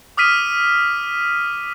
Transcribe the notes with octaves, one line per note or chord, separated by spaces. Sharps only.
D6 D#6 F6 B6 D#7